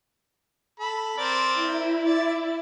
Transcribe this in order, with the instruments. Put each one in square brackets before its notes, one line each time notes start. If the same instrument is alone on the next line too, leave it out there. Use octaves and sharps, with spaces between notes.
[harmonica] A4 B5
C4 A#4 D5
[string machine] E4
[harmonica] D5